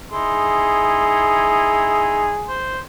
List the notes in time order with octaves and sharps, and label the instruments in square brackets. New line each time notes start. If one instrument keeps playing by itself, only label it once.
[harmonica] D#4 E4 C6 [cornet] G#4
[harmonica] C5